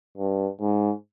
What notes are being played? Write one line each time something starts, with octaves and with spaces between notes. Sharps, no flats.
G2
G#2